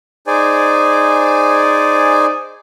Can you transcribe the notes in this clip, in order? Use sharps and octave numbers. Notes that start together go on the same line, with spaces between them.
D#4 G#4 C5 D5 G#5